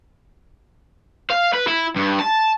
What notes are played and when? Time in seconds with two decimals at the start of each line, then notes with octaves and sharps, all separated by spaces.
1.30 F5
1.53 B4
1.68 E4
1.96 G2
2.20 A5